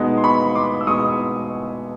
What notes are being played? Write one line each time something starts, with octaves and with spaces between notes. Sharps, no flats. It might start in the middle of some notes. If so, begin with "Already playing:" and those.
Already playing: B2 G#3 B3 D#4
C6
B5 C#6
C6 D6
E6
B2 G#3 B3 D#4 C#6 D#6